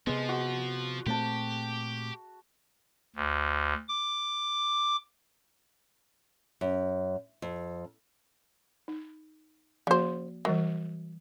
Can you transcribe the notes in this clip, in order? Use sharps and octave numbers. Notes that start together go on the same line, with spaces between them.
C3 F3 G#3 B3
F#4
A#2 A3 C4 G4 A5 C6
D2
D6
F#2
F2
D#4
C#3 F3 A#3 F#4 C5
E3 F#3 G3 A#4